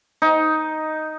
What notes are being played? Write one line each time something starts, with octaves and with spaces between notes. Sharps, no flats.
D#4